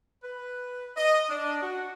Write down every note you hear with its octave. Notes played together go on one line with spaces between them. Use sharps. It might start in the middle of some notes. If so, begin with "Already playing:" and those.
B4
D#5
D4
F#4